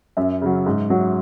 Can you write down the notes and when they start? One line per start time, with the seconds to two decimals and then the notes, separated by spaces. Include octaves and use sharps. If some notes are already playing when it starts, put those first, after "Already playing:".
0.17 F#2 E5
0.41 C#3 F#3
0.66 G#2
0.90 F#3